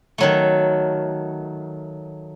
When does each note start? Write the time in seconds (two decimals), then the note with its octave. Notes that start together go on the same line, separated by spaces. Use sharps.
0.18 D#3 F#3 A3